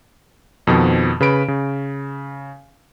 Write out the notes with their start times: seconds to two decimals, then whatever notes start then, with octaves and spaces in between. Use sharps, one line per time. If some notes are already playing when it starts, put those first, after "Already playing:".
0.67 F2 B2 D#3 F3
1.20 C#3 B4 B5 D7
1.48 C#3